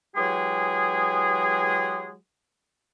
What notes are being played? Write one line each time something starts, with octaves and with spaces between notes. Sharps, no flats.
E3 F#3 G#3 G4 G#4